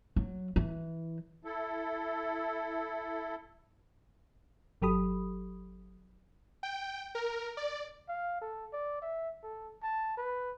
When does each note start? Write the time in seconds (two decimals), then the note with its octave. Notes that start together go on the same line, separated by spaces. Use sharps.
0.16 F#3
0.56 E3
1.45 E4 A4
4.82 G1 F#3 G4 A4 B5 D#6
6.63 G5
7.15 A#4
7.57 D5
8.09 F5
8.42 A4
8.73 D5
9.02 E5
9.43 A4
9.83 A5
10.17 B4